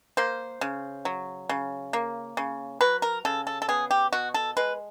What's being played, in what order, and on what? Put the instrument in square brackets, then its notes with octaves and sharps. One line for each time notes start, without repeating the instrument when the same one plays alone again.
[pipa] A#3 C5
C#3
F#3
C#3
A#3
C#3
F#3 B4
A#4
C#3 A4
A4
A4
B3 G#4
G4
B2 F#4
A4
G#3 B4